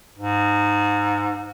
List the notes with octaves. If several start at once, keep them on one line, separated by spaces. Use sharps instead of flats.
G#2